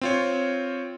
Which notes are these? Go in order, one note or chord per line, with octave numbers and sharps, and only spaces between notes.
C4 F4 C#5